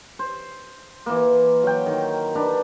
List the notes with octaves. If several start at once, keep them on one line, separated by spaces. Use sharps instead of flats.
C5
E3 A#3
F#3 G5
D#3
D4 B4 A#5